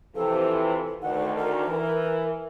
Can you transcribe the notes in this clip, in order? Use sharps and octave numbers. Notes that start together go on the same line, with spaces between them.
C3 E3 F3 A4
D2 D#3 F#5
A#4
E3